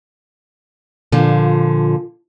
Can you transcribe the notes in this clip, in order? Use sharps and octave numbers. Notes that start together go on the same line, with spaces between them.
A#2 D3 F3